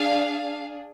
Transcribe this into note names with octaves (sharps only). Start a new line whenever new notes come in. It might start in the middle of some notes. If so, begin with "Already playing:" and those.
Already playing: D4 G#4 F5